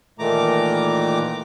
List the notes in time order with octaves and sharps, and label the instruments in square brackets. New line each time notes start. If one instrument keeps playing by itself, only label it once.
[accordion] A#2 D#3 E3 A3 A#5 D6